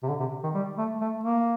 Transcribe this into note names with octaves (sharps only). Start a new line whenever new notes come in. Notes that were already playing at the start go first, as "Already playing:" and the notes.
C3
D3
C3
D#3
G3
A3
A3
A#3